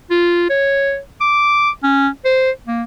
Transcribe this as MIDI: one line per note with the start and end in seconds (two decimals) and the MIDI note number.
0.10 0.48 65
0.50 0.98 73
1.21 1.70 86
1.83 2.08 61
2.25 2.51 72
2.67 2.82 58